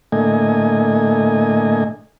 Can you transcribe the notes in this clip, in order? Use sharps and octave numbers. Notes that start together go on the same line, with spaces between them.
A2 D3 A3 A#3 D#5 G#5